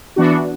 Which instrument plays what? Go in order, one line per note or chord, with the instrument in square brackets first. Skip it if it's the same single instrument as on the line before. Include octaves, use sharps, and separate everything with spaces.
[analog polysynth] E3 B3 D4 F#4